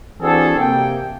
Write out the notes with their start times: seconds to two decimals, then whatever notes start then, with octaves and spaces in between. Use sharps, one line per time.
0.21 E3 C4 D4 F#4 G#4 A4
0.57 C3 A#3 G5